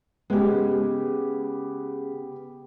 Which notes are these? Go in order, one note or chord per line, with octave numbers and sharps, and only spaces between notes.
C#3 G#3 B3 G4